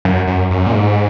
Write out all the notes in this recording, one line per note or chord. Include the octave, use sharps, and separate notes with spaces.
F#2
F#2
F#2
A#2
G#2